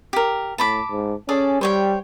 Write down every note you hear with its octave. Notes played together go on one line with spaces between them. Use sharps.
G4 A#4
A2 A5 B5 D6
G#2
C#4 G#4 A4 D5
G3 C5 C#5 G5